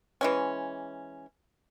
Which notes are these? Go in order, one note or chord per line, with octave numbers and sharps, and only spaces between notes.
E3 G#3 C#4